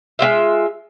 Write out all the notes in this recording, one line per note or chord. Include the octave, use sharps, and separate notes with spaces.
G#3 C4 F4 E5